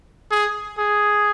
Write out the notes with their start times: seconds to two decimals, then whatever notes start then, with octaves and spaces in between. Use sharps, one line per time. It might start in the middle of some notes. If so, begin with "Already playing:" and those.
0.31 G#4
0.78 G#4